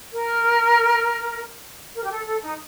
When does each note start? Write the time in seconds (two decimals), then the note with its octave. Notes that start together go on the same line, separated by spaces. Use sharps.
0.13 A#4
1.96 A#4
2.04 G4
2.12 A4
2.26 A4
2.43 D#4